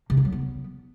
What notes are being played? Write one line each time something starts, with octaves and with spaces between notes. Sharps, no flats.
C3
D#3
F#3
B3